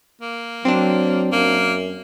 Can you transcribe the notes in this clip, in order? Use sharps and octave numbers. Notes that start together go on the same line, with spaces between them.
A#3
F#3 C4 D4
F#2 A#3